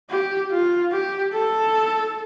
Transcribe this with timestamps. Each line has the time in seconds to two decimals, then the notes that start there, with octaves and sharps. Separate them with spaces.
0.10 G4
0.51 F4
0.92 G4
1.33 A4